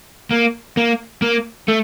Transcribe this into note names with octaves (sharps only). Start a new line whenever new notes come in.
A#3
A#3
A#3
A3